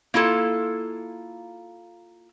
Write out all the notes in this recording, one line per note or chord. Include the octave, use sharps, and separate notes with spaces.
A#3 E4 F4 A4